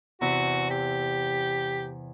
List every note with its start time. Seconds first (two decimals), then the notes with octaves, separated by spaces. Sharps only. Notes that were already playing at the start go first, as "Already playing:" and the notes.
0.21 E2 C3 E3 F#4
0.70 G4